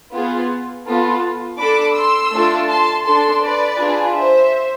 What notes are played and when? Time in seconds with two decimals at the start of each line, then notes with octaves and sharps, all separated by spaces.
0.13 B3 F4 G#4
0.86 B3 F4 A4
1.59 D4 A4 B5 D6
1.95 C6 E6
2.32 A3 D4 F4 A4
2.69 A5 C6
3.05 D4 A4 A5 C6
3.42 B4 D5
3.78 D4 F4 G#4
4.14 C5 E5